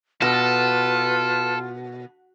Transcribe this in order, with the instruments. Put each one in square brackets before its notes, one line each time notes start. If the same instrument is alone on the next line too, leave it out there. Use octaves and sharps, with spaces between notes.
[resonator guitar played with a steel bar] B2 [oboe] F4 [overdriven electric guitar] A4 [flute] B4